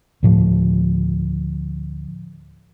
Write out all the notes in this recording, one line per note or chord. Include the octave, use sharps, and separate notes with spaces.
D2 A2 F3